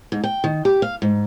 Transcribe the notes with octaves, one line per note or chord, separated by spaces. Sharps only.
G#2
G5
D#3
G4
F5
G#2